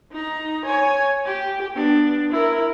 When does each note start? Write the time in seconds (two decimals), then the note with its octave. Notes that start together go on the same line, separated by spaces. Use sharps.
0.12 D#4 A#5
0.66 C#5 G#5
1.25 G4
1.76 B3 D4
2.31 E4 A#4